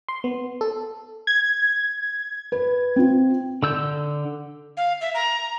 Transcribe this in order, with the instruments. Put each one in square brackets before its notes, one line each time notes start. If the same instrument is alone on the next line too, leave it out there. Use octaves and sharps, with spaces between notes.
[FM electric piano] C6
B3
A4
[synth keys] G#6
[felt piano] B4
C4 F4
[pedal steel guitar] D3 E6 G6
[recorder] F5
E5
A#5